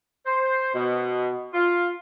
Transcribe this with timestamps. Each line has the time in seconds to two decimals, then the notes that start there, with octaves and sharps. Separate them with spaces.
0.26 C5
0.74 B2
1.54 F4